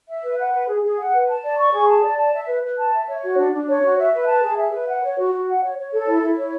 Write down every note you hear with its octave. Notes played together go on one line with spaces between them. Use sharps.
E5
B4
F#5
B4
G#4
G#4
F#5
B4
A5
D5
C#6
G#4
A5
D5
A5
E5
B4
B4
A5
E5
C#5
F#4
D4
D4
C#5
F#4
E5
B4
A5
G#4
E5
B4
F#5
C#5
F#4
F#4
F#5
C#5
C#5
A4
E4
E4
C#5